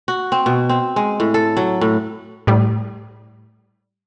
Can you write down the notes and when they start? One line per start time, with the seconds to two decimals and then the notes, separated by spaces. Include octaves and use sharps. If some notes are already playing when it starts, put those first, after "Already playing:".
0.08 F#4
0.32 C4
0.46 B2
0.69 C4
0.96 G#3
1.20 A2
1.34 A4
1.57 F#3
1.81 A2
2.47 A2 G3